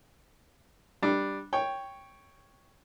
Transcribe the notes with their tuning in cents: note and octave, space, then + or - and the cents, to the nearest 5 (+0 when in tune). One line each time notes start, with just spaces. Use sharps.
G3 +0 D4 +0
C#5 +0 G5 +5